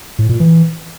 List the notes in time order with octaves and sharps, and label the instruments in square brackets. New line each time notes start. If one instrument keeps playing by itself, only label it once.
[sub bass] A2
A#2
E3